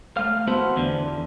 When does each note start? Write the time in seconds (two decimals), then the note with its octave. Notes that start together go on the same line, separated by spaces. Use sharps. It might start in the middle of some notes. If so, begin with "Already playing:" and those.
0.17 A3 F5
0.47 B3 E4 F#4 A4 C5
0.76 E2 D3 E3